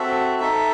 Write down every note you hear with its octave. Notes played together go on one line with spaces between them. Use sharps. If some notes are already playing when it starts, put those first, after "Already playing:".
Already playing: C4 F#4 A4 E5
D#4 A4 E5